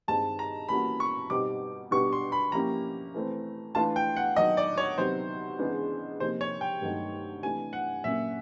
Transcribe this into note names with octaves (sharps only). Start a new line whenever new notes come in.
G2 D#3 G#3 C4 A5
A#5
E3 G3 A#3 C#4 F#4 B5
C#6
B2 G3 C4 D#4 G4 D6
B2 G3 B3 D4 G4 C#6
C6
B5
F3 A#3 C#4 E4 G4 A#5
E3 A3 C4
E3 A3 D4 F4 A5
G5
F#5
D#3 F#3 B3 D#5
D5
C#5
C3 D#3 F#3 B3 C5
C#3 E3 G#3 B3 D4
C3 F3 A#3 D#4 C5
C#5
G5
G2 D#3 F#3 A3
C3 E3 A3 D4 G#5
F#5
A#2 F#3 A#3 C#4 E5